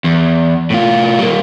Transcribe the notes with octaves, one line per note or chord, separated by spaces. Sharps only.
E2
A2 F4
G3 A#3